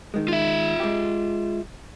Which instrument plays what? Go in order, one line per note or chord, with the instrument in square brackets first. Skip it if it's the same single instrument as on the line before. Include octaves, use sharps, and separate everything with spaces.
[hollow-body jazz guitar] D#3 G#3
[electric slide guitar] F4 E5
[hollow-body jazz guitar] G#3 G4